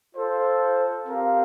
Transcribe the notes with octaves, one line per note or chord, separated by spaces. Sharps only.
F4 A4 C5
C4 G4 A#4 F5